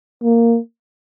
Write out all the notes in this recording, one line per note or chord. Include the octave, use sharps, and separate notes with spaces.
A#3